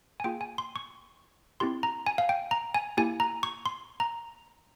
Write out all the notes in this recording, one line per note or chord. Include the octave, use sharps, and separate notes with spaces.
G#5
A#3 F4 G#4 G5
G#5
C6
C#6
C4 E4 G4 C6
A#5
G#5
F5
G5
A#5
G#5
A#3 E4 G4 G#5
A#5
C#6
C6
A#5